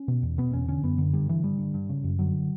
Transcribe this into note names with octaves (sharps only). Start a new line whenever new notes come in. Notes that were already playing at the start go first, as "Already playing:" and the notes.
Already playing: C#4
B2
E2
B2 B3
E2 C#4
D3 C#4
F#2 B3
D3
G2 G3
D3 E3
G2 G3
D3
G2
C#3
F#2
D3 F#3